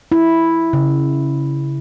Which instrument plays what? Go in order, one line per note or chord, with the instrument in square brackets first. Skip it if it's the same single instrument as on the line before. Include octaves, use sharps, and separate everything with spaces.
[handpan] E4
C#3